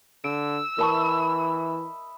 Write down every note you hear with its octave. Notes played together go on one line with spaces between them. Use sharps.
D3 E6 D7
E3 A#4 D#5 E5 A5 B5 C#6